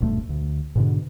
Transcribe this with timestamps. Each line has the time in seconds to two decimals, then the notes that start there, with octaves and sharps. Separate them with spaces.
0.01 D#1 B1 G2 A3
0.29 D2
0.75 G#2 B2 D3